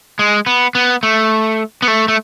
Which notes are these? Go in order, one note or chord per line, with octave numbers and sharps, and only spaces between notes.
G#3
B3
B3
A3
B3
A3
A3